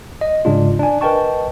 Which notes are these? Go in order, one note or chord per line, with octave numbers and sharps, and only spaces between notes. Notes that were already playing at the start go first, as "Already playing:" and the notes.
D#5
G#2 C#3 G#3 D4 F4
D4 G#5
A#4 B4 D#5 G5 A5 C#6